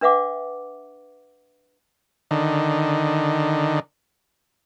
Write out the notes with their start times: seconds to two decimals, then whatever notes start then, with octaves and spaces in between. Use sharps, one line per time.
0.01 D4 B4 E5 F#5 D6
2.31 D3 D#3